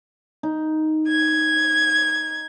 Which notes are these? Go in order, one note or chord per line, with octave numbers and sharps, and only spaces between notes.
D#4
G#6